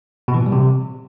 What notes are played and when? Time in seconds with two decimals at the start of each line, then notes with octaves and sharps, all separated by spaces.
0.28 B2
0.34 E3
0.40 A#2
0.46 G3
0.52 C3